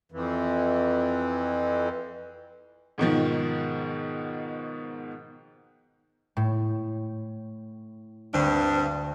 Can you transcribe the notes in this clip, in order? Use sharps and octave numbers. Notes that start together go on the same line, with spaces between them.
F2 E3
G#2 B2 D#3 F3
A2
D2 G2 C4 D4